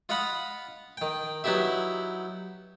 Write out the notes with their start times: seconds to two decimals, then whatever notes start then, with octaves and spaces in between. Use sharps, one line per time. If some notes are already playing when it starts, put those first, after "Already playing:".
0.09 F4 D#5 F5 F#5 B5 D#6
0.97 D#3 G5
1.44 F#3 B3 D#4 E4 G4 E5